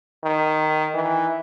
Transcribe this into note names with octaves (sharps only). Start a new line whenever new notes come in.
D#3
E3